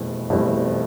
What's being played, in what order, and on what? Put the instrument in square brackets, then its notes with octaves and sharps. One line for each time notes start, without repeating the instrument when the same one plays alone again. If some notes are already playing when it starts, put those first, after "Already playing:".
Already playing: [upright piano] F1 E2 B2 G3 C4
F1 E2 B2 G3 C4